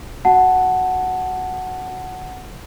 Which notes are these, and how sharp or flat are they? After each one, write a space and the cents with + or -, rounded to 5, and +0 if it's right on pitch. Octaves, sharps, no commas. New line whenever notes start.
F#4 +0 F#5 +0 A5 +0